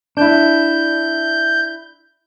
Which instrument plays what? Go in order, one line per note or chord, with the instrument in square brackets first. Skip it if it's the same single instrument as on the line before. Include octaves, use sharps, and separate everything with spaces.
[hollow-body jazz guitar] D4 E4 [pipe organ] G6